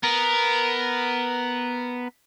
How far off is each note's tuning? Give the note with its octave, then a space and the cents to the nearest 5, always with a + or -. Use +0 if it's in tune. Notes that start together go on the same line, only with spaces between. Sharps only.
B3 +0 A#4 +0